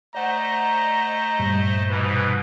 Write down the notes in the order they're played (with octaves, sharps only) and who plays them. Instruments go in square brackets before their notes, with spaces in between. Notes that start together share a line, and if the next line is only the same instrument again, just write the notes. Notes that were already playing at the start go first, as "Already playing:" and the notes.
[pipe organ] A3 C5 D#5 [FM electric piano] D5 F#5 [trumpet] A#5
[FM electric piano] G2 A#2 G3
[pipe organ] G#2 B2 E3 [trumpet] B4